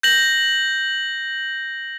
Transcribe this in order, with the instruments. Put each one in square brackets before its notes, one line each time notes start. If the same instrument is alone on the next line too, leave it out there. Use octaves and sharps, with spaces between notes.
[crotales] G6 A#6 F#7